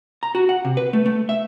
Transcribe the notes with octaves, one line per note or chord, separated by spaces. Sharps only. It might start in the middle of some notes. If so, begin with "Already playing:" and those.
A#5
F#4
F#5
C3
B4
A3
A3
E5